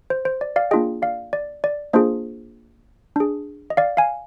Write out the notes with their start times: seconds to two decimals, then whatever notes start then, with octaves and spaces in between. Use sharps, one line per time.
0.10 C5
0.25 C5
0.41 D5
0.56 D5 F5
0.71 A#3 D4 F4 G#4 D#5 G5
1.02 D5 F5
1.33 D5
1.64 D5
1.93 A#3 D4 F4 G#4 C5 D#5
3.16 D4 G#4
3.70 D#5
3.77 D5 F5
3.97 F5 G#5